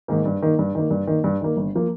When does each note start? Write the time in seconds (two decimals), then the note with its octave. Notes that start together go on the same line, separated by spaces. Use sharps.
0.08 G#2 D#3 A#3
0.25 G2
0.42 D#3 A#3
0.59 G2
0.75 D#3 A#3
0.91 G2
1.07 D#3 A#3
1.24 G2
1.41 D#3 A#3
1.57 G1
1.75 F3 A#3